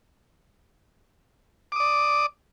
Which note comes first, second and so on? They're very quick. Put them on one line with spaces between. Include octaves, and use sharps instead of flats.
D6 D#6 D5